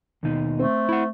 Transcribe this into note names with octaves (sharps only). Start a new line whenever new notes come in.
D#2 B2 D#4
A3 C4
E4 F#5